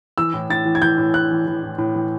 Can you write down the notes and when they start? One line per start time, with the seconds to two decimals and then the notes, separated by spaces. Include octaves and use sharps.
0.18 E3 E6
0.34 A2
0.50 A2 A6
0.65 E3
0.75 G#6
0.82 E3 G6
0.98 A2
1.14 A2 F#6
1.31 E3
1.47 E3
1.63 A2
1.78 A2
1.95 E3